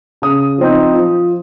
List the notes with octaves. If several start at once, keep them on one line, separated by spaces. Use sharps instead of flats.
C#3 D#6
F3 C4 D#4
F3